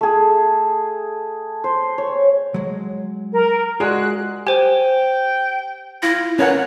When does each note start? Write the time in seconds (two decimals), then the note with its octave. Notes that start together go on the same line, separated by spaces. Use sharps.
0.01 A3 G#4
1.64 C5
1.98 C#5
2.54 F#3 G#3
3.33 A#4
3.80 G#3 F4 F#4 G#4 D5 F#6
4.47 G4 C5 G5 G#5
6.03 E4 F4 A#6
6.39 C#4 A#4 B4 C#5 F#5